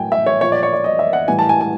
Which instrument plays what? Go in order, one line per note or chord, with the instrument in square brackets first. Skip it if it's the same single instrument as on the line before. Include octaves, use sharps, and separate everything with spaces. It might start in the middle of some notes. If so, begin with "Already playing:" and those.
Already playing: [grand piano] A2 F#3 G5 G#5
E5
C#5
A#2 F3 C#5
D5
C#5
D5
D#5
E5
F#5
A2 E3 G3 G#5
A5
G#5
G#5